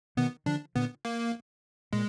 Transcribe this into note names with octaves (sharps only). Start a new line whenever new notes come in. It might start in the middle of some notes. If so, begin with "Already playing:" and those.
B2 D#3 B3
D3 F3 D4
A#2 D3 B3
A#3
A#2 G#3